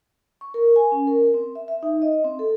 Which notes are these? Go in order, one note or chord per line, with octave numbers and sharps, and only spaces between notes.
C#6
A#4
G#5
C#4
A#4
C4
E5
E5
D#4
D#5
C4
A4